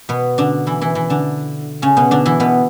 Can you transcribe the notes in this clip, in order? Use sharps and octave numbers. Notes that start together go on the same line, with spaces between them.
B2 B3
D3 D4
E3 E4
E3 E4
E3 E4
D3 D4
C#3 C#4
B2 B3
D3 D4
E3 E4
B2 B3